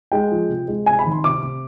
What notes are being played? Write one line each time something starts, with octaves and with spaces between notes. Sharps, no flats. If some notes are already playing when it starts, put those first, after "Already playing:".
G#3 G5
F3
C3
G#3
C3 G#5
B5
D#3
C6
C3 D6
C3